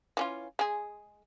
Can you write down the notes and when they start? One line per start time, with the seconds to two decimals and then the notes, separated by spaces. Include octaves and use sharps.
0.17 E3 C#4 F4
0.59 G#3 G#4